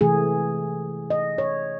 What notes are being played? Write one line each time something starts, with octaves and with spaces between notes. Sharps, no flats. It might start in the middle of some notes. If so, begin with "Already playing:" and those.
C3 E3 A3 G#4
D#5
C#5